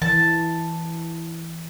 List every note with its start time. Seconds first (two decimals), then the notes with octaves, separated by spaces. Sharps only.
0.02 E3 A5